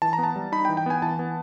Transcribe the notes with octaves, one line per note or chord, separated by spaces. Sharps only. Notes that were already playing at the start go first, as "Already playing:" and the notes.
E3 A5
A#5
B3 A5
G3
D#4 B5
G5
E3
G5
B3 G#5
E3 A5
B3